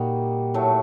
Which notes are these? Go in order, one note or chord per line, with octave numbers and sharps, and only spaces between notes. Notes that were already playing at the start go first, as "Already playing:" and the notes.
Already playing: A#2 G3 A#3 D#4 F#4
A2 F#3 A3